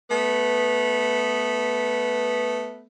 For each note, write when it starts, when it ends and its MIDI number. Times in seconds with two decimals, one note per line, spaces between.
0.09 2.87 57
0.09 2.87 59